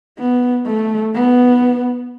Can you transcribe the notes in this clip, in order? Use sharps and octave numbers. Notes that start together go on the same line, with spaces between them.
B3
A3
B3